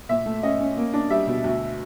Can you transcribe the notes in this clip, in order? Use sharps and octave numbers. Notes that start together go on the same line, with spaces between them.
A#2 E5
A3
C#4 D#5
C#4
A#3
D4
G3 E5
B2
D2